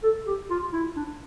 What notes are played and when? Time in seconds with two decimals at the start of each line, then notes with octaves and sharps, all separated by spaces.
0.03 A4
0.27 G4
0.50 F4
0.73 E4
0.96 D4